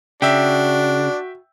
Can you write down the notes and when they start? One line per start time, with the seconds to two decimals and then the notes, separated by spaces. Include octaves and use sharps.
0.22 C#3 D4 F#4 E5 G5